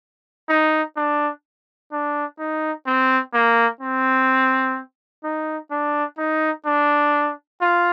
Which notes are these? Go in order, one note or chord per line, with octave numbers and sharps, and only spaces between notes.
D#4
D4
D4
D#4
C4
A#3
C4
D#4
D4
D#4
D4
F4